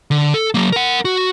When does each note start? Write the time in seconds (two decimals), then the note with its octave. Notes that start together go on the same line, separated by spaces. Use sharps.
0.11 D3
0.34 A4
0.54 F#3 A#3
0.73 A#4 F#5
1.05 F#4